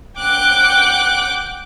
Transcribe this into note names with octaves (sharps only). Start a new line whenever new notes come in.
F#5 G5 D6 F#6